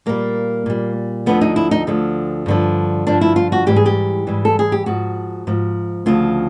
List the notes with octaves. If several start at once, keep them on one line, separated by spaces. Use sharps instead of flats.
A#2 G3 A#3
A#2 G3
D2 D3 F3 B3
D#4
E4
D#4
D2 D3 F3
G2 D3 F3
G2 D3 F3 D4
E4
F4
F#4
G#2 E3 G3 G4
G#4
G4
G#2 E3 G3
A4
G#4
G4
G#2 F3 F#4
G#2 F3
D2 C#3 F3 F4